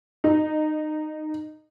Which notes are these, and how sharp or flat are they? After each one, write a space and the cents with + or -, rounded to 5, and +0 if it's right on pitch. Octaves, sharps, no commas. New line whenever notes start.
D#4 -15